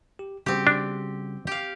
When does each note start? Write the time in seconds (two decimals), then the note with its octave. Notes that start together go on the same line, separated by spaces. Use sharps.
0.19 G4
0.46 C#3 G3 C4 F#4 G4
0.67 D4
1.47 G4 F5